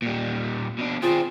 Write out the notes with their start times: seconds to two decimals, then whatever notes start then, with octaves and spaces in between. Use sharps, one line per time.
0.02 A#2 G3
0.78 B2 D4
1.02 C4 F4 G#4